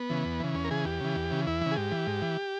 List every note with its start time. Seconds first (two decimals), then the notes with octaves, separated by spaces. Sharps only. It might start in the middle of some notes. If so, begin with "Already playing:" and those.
Already playing: B3
0.10 C#3 E3
0.25 E2
0.40 C#3 E3
0.54 E2 C#4
0.64 A#4
0.70 C#3 E3 G#4
0.85 E2 G4
1.01 C#3 E3
1.16 E2
1.31 C#3 E3
1.47 E2 E4
1.61 C#3 E3
1.71 G#4
1.76 G#2 G4
1.91 E3
2.07 G#2
2.22 E3